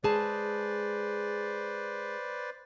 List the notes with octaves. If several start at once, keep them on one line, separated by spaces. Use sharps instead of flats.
G#3 G#4 B4 C5 D5 A5